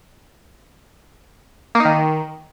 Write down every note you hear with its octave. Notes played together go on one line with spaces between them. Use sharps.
A#3
D#4
D#3